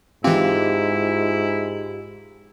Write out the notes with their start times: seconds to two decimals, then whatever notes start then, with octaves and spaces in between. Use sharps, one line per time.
0.24 G#2 E3 C4 E4 F4 G4